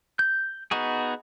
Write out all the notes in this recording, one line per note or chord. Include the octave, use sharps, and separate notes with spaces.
G6
B3 D#4 F#4 G#4